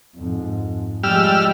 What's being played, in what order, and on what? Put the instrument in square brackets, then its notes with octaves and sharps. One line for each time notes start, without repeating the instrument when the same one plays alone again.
[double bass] F2 G#2
[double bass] F3 G#3 [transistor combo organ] G3 E6 F6